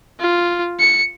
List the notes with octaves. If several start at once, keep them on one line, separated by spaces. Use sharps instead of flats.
F4
C#7